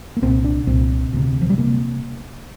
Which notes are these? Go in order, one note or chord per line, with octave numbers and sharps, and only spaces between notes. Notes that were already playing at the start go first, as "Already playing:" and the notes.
A#3
C2 A#2 C4
D4
C2 A#2 C4
D2 C3
F3
G3
C3 A#3